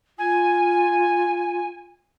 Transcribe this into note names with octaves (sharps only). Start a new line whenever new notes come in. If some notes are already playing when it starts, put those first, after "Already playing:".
F4 G#5